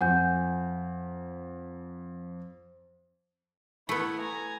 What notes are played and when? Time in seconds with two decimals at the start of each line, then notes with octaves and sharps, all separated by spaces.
0.01 F2 F#5 G#5 G6
3.89 A3 B3 E4
4.20 G#5 A#5